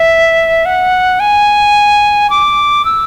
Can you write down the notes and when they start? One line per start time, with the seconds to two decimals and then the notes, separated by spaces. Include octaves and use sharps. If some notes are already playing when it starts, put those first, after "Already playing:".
Already playing: E5
0.65 F#5
1.20 G#5
2.30 D6
2.85 E6